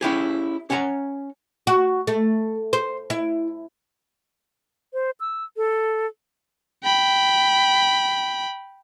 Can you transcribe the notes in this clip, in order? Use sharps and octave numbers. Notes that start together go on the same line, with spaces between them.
C#4 E4 G4 G#4
C#4 C#5 F#5 A5 A#5
F#4
A3
C5
E4
C5
E6
A4
G5 B5